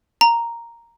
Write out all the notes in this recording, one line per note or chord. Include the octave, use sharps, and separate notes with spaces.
A#5